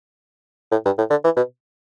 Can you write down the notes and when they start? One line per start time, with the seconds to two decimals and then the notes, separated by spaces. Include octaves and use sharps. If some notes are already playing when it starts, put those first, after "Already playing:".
0.72 A2
0.85 G2
0.98 A2
1.10 D3
1.24 E3
1.37 B2